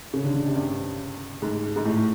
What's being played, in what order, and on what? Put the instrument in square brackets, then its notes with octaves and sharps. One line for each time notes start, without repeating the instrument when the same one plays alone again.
[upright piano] C#3
D3
D3
C3
G2
G#2
G#2
A2